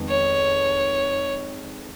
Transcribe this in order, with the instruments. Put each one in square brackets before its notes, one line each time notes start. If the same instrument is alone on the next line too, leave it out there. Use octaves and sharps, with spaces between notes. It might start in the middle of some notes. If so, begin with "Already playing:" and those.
Already playing: [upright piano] F2 D#3 G#3 B3
[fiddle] C#5